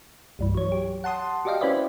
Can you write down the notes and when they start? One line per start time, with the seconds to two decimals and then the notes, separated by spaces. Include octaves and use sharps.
0.39 C2 G2 E3
0.55 F#3 C#5
0.72 G4
1.04 F#5 A5 C6 D#6
1.45 F#4 G4 D5 D#5 F5 G5
1.61 C#4 E4 B4 C5 D5 E5